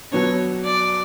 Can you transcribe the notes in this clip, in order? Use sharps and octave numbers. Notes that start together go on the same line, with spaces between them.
B2 F#3 B3 D4 C#5
D5